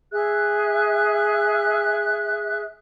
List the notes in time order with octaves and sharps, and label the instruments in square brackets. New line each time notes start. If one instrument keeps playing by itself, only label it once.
[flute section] G#4 E5 F#6